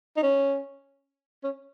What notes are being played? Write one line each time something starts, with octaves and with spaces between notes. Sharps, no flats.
D#4
C#4
C#4